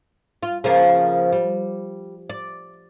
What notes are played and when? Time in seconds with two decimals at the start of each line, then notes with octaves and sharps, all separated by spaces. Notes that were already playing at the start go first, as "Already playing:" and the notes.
0.43 F4
0.64 C#3 F3 A#3
1.32 G3
2.30 D5